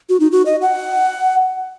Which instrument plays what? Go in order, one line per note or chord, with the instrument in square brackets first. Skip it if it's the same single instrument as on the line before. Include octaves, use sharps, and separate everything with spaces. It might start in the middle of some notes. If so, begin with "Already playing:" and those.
[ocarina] F#4
D#4
F#4
D#5
F#5